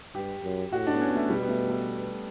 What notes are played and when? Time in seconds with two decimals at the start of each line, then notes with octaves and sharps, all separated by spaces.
0.15 G2 G4
0.44 F#2
0.72 A2 F#4
0.87 D4
0.94 B3
1.01 C#4
1.10 B3
1.16 A3
1.30 B2 G3
1.43 B3
1.49 A3
1.69 A3